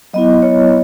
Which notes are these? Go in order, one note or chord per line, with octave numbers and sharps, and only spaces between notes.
F#3 B3 E4 D#5
C#5